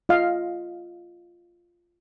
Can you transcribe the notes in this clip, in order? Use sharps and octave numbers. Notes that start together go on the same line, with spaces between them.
F4 D#5 F5